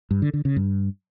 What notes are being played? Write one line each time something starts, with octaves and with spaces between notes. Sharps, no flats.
G2
D3
D3
C#3
G2